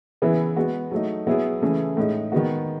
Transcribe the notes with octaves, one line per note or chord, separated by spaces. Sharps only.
C#3 E3 B3 E4 G#4
G#3 B3 F#4
F#3 A3 D#4
F#3 B3 E4 G#4
C#3 E3 A3 C#4 G#4
A2 G#3 D#4
D#3 G#3 B3 F#4